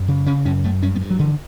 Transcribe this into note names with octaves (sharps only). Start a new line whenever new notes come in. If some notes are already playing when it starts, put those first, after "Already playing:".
Already playing: F#2
C#3
C#3 C#4
F#2 C#4
F#2 A3
G2 C#4
B3
G2
F#3
D3 E3